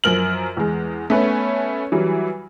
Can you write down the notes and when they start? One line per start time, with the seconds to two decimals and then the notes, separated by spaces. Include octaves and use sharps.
0.04 F#2 F3 A#4 F6 F#7
0.57 E2 G#3
1.10 A3 B3 C#4 B4
1.92 E3 F#3 G3